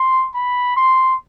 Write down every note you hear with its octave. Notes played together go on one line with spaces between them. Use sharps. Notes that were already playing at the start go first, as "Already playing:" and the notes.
Already playing: C6
B5
C6